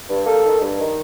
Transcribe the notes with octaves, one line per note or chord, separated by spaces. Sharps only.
G2
A#3 A4
D#3
G2
D#3